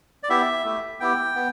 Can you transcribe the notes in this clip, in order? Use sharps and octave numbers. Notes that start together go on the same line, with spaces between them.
D5
B3 E4 G4 E5
A3 E4 G4
B3 E4 G4 G5
B3